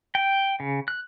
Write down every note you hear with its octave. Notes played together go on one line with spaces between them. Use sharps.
G5
C#3
F#6